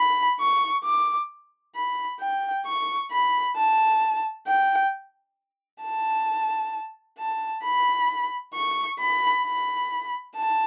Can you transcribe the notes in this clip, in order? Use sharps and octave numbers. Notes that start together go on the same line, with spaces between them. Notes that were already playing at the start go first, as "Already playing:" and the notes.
Already playing: B5
C#6
D6
B5
G5
C#6
B5
A5
G5
A5
A5
B5
C#6
B5
B5
A5